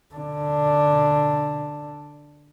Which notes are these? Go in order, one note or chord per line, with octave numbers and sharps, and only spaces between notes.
D3 D4